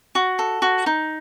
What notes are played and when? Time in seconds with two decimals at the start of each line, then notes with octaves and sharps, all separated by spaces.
0.15 F#4
0.39 A4
0.62 F#4
0.86 D#4